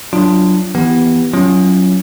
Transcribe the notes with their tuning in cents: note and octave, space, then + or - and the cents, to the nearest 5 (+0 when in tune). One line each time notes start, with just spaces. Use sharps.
F#3 +0 D4 +0 F4 -15
E3 +5 B3 -5 G4 +0
F#3 +0 C#4 +0 F4 -25